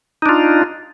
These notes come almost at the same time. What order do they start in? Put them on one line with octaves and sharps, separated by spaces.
D#4 D4 F4